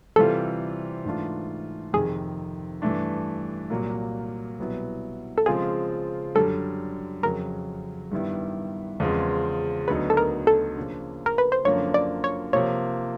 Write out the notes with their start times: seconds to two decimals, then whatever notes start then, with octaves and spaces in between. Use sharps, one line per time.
0.16 C3 E3 G3 C4 F4 A4
1.05 G#2 E3 A3 D4 F4
1.93 F2 C3 D#3 G#4
2.82 G2 E3 A3 D4
3.70 C2 A#2 F#3 A#3
4.59 C2 B2 F#3 B3 E4
5.38 A4
5.46 C#3 F3 G#3 C4 F4 G#4
6.35 F#2 D3 G3 A4
7.23 F2 C#3 F#3 A#4
8.12 G2 D#3 G3 B3 E4
9.00 E2 C#3 F3 G#3 C4
9.88 D2 D3 F#3 B3 D#4 B4
10.10 A4
10.17 A#4
10.47 A4
10.77 C#3 F3 A#3 D4
11.26 A#4
11.38 B4
11.52 C5
11.65 F#2 D3 F3 A#3 C#4 C#5
11.94 D5
12.24 C#5
12.53 C3 F3 A#3 C#5